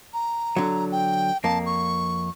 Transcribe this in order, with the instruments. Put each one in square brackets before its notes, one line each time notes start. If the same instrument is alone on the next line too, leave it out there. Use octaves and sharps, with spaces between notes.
[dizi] A#5
[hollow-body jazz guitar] D3 F#3
[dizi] G5
[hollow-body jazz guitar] F2 A#3 [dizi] A5
[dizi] C#6